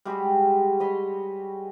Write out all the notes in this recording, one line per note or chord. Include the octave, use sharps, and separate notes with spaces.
G3 G#3 F#4 G4
C#5 D#5 B5 C6